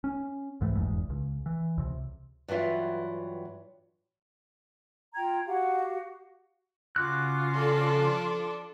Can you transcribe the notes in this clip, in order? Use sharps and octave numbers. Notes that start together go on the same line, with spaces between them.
C#4
C2 G#2 E3 A3
F1 B1 E2 G#2
C#2
E3
C#2 C3
G2 E3 F#3 F4 E5
F4 G5 A#5 G#6
F#4 G4 F5 F#5
C#3 F4 F#4 C6 D6 F#6
F3 D4 A4